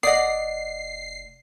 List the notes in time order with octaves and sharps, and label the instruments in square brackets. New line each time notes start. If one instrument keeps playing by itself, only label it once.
[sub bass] F1 [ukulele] D5 D#5 [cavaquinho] F#5 D#6 [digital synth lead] C7